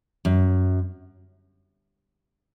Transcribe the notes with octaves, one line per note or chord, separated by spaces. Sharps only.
F#2